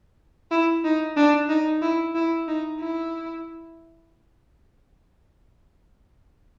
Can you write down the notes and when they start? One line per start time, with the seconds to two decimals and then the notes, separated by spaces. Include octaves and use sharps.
0.51 E4
0.84 D#4
1.17 D4
1.49 D#4
1.82 E4
2.15 E4
2.47 D#4
2.80 E4